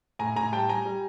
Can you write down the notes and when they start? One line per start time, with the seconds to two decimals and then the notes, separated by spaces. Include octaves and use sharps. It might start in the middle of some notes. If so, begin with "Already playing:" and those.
0.19 A2 G#5 A#5
0.36 A2 G#5 A#5
0.52 G3 G5 A5
0.69 G3 G#5 A#5
0.86 G3